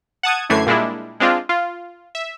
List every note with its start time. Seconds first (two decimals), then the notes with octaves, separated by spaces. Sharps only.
0.23 F#5 A5 D#6 G#6
0.50 F#2 D3 E3 A3 G#6 C7
0.66 A#2 G3 G#3 D4 E4
1.20 G#3 C4 D4 F4
1.49 F4
2.15 E5